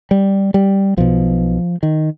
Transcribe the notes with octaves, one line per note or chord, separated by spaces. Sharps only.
G3
G3
B1 B2 F3
D#3